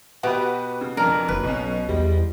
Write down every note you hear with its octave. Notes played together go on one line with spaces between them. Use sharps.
B2 F#4 G4 B4
C#3
F2 D4 A#4
F#1 B4
B1 B2 C#4
E2 G3 G#3